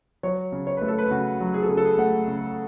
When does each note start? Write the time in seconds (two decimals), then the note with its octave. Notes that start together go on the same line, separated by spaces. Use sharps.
0.23 F#3 C#5
0.52 C#3
0.67 C#5
0.77 A3 B4
0.88 A4
0.99 B4
1.11 C#3 F#4
1.40 F#3
1.54 G#4
1.62 A4
1.69 C#3 G#4
1.77 A4
1.85 G#4
1.98 A3 F#5
2.28 C#3